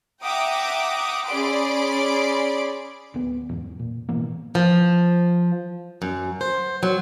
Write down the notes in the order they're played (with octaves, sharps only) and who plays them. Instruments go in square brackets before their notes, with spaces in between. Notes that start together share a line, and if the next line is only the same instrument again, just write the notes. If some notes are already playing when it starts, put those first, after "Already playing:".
[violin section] E5 F#5 G5 A#5 D6 D#6
C#4 G#4 D5 B5 C6 D7
[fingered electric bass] D1 B3
E2 G#2
A#2
G#2 B2 E3 A#3
[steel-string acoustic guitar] F3
F#2
C5
F#3